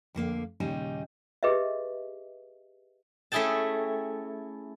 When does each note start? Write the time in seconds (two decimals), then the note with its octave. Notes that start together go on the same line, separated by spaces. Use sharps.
0.15 F2 D3 A#3 F5
0.60 D#2 A#2 C#3 G3 D#4 G#5
1.43 G4 G#4 B4 D#5 E5
3.32 A3 C#4 E4 G#4 G5 A5